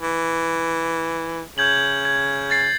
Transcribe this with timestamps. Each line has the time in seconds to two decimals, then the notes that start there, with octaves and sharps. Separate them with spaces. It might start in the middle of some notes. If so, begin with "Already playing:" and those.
0.02 E3
1.58 C#3 G6 G#6 F#7
2.05 G#6
2.50 G#6 A6 C7